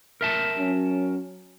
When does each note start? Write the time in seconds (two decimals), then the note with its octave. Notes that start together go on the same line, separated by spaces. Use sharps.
0.21 A#4 E5 A5
0.57 F#3 C#4